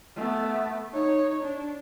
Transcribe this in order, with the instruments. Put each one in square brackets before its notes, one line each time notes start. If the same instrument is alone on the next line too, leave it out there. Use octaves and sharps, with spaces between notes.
[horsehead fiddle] A3 B3
D#4 C#5
D4